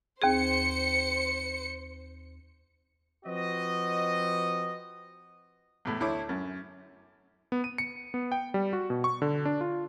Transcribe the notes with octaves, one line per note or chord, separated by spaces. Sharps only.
D#2 C4 G#4 C5 C#7
F3 C4 F#4 B4 D#5
E2 A2
D2 E4 C#5 D6
F#2
B3
D#7
C#7
B3
G5
G3
F#4
B2
C#6
D3
D4
F4